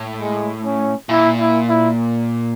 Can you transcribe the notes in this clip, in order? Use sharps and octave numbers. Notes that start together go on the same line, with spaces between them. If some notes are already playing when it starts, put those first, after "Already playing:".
Already playing: A2
G#3
C#4
A#2 E4
E4
E4